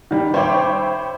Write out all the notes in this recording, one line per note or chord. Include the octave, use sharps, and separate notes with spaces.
D#3 G3
C5 C#5 E5 G5 B5 D6